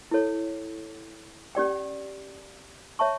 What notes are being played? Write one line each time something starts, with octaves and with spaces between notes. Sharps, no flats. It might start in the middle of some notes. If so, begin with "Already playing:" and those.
E4 A4 C#5
C#4 G4 D5 G5
C#5 E5 A5 C#6